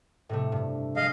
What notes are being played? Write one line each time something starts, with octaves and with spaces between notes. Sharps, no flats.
A2 C3 A3
G2
G#3 D#5 F5